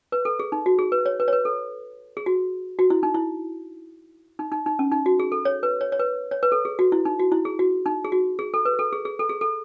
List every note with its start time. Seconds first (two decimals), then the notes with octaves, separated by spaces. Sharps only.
0.12 B4
0.25 A4
0.39 G#4
0.52 D#4
0.66 F#4
0.79 G#4
0.92 B4
1.06 C#5
1.20 B4
1.28 C#5
1.33 B4
1.45 A4
2.17 G#4
2.26 F#4
2.79 F#4
2.90 E4
3.03 D#4
3.15 E4
4.39 D#4
4.52 D#4
4.66 D#4
4.79 C#4
4.92 D#4
5.06 F#4
5.20 G#4
5.32 A4
5.45 C#5
5.63 B4
5.81 C#5
5.92 C#5
5.99 B4
6.31 C#5
6.43 B4
6.52 A4
6.65 G#4
6.79 F#4
6.92 E4
7.05 D#4
7.19 F#4
7.32 E4
7.45 G#4
7.59 F#4
7.86 D#4
8.05 G#4
8.12 F#4
8.39 G#4
8.54 A4
8.65 B4
8.79 A4
8.93 G#4
9.05 G#4
9.19 A4
9.29 G#4
9.41 A4